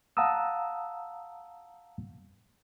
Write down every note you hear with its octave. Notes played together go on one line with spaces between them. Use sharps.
F5 F#5 A5 A#5 D#6 E6